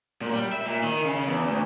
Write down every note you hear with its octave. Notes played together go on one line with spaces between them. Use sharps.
A#2
G3
E5
A#2
D#3
C#3
E2
D2